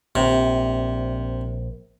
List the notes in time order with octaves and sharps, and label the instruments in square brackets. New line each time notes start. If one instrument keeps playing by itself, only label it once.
[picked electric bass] A#1 [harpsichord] C3